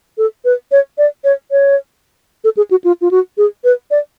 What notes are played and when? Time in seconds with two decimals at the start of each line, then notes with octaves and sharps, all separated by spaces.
0.18 A4
0.45 B4
0.72 C#5
0.98 D5
1.24 C#5
1.51 C#5
2.44 A4
2.57 G#4
2.71 F#4
2.84 F4
3.01 F4
3.11 F#4
3.38 G#4
3.64 B4
3.91 D5